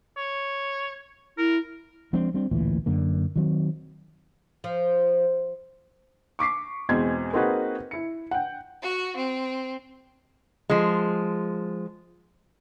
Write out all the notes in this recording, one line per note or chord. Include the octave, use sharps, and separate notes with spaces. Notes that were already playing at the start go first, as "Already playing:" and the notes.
C#5
E4 A#4
F3 G#3 C4 D4
G3 C4 D4
A1 D2 A#2 E3
F#2 D3 A#3
D#3 F#3 C4
F3
C#6 D6 B6 C7
E2 B2 G#3 C4 G#6
A#3 C4 D#4 F#4 G#4 B4
E4 C#7
F#5 G5
F#4
C4
F3 G#3